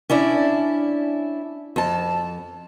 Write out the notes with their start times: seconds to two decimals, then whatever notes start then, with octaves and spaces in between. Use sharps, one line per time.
0.10 C#4 D4 E4 D5
1.76 F2 A5